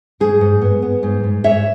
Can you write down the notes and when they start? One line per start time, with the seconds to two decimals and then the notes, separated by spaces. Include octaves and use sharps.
0.20 G#2 G#4
0.41 G#2
0.61 B3
0.82 B3
1.03 G#2
1.23 G#2
1.44 G#2 C#5 E5